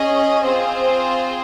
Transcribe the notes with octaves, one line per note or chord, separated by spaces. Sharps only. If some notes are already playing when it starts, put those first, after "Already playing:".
Already playing: C#4 G#4 D#5
C4 F4 G#4 C5